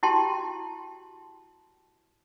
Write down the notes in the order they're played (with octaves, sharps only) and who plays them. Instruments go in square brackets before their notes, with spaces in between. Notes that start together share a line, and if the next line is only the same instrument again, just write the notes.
[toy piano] E4 F#4 G4 G5 A5 C6